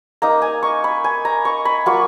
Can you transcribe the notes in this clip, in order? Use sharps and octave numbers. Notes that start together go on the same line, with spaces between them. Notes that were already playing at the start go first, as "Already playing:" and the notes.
A#3 D#4 A#5
G#5
C#6
B5
G#5
A#5
C#6
B5
F#3 A#3 F4 C#6